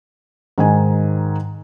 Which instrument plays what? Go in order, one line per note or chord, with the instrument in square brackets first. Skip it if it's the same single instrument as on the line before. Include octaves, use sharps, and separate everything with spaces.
[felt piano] G#2 D#3 G#5